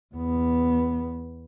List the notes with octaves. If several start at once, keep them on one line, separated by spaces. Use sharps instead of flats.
E2 B3